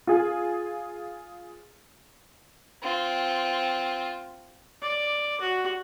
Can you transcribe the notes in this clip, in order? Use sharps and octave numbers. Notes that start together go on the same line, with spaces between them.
F4 G#4
C4 F4
D5
F#4